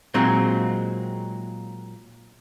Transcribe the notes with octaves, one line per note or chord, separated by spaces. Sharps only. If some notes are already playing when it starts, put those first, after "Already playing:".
A#2 F#3 G#3 C4 D#4